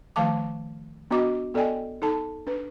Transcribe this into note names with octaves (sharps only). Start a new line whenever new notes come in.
D#3 F3 A3 F5 A5 D6
B3 D4 F#4 D#5 D6
B3 A4 D5 D#5 G5 G#5
D#4 A4 A5
D4 B4